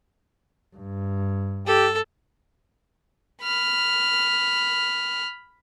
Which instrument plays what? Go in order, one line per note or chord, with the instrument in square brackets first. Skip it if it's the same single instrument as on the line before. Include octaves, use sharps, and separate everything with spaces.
[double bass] G2
[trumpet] G4 [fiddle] A4
[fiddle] B5 F6